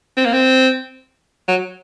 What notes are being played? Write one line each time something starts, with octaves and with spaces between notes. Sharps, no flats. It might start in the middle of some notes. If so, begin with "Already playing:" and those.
C4
A#3
C4
F#3